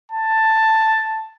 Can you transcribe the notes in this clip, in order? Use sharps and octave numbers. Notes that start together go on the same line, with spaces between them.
A5